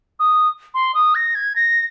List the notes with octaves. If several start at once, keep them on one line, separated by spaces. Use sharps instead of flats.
D#6
C6
D#6
A#6
G#6
A#6